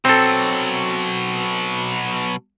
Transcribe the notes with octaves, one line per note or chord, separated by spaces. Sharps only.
B2 F#3 C4 A4